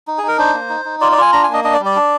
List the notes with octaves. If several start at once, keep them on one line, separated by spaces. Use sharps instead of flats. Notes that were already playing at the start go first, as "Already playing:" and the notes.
D#4
G#4
D#4 A#4
D4 C5
A#3
D#4
D#4
F4 D5
D5
F4 G#5
D4 A#5
G#5
A#3
D#5
D4 D#5
D5
G3
D5
D4